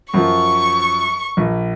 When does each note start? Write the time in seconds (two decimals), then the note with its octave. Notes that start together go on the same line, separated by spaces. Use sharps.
0.14 F#2 F3 C#6
1.37 A#1